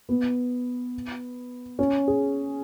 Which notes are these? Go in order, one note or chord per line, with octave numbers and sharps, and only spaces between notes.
B3
C#4
G#4